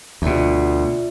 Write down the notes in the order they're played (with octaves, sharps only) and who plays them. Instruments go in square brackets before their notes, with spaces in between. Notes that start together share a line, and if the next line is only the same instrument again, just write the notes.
[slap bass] D2 B2 [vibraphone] F4 D5 E5